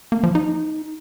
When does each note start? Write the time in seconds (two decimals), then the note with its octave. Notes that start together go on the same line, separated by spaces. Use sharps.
0.12 A#3
0.23 F3
0.35 D#4